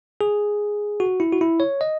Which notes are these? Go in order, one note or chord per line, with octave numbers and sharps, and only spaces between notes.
G#4
F#4
E4
F#4
E4
C#5
D#5